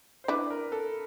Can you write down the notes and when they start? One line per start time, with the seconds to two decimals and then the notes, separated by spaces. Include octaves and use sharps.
0.24 C5
0.28 D4 E4 B4
0.50 A#4
0.72 A4